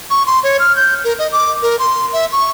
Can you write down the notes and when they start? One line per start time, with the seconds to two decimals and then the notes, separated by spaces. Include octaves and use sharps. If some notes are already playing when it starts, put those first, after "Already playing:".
0.10 C#6
0.26 C6
0.43 C#5
0.59 F6
0.76 G6
1.04 A#4
1.19 D#5
1.32 D6
1.62 A#4
1.79 C6
2.13 E5
2.32 C#6